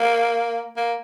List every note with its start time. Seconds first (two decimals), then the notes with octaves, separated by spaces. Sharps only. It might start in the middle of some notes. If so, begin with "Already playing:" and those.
Already playing: A#3
0.76 A#3